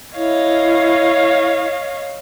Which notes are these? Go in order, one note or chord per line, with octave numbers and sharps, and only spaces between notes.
E4 C#5 D#5 F5